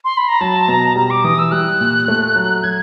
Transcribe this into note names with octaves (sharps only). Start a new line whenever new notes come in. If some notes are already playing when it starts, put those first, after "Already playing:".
C6
B5
A#5
F#3 A5
B2 A#5
G3 A#5
D6
E3 D#6
E6
G3 F#6
A#2
A3
F#3
F#3 G#6